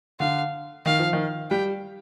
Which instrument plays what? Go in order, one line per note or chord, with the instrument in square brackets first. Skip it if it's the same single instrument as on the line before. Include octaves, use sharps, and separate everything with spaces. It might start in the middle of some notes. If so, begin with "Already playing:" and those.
[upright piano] D3 [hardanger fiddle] F5
[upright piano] D#3 [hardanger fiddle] F5
[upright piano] F3
D#3
[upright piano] G3 [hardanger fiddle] G5